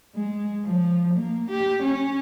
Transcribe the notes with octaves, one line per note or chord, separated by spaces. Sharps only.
G#3
F3
A#3
G4
C#4